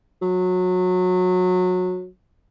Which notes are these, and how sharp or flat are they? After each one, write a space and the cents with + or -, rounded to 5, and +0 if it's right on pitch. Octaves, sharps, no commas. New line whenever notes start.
F#3 -20